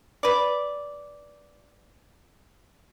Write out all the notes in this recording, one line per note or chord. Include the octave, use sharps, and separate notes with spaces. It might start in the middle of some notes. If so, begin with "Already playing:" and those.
B4 D5